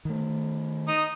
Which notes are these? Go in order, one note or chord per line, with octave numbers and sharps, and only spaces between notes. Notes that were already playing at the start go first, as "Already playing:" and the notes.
D#3 A3
D#4 D#6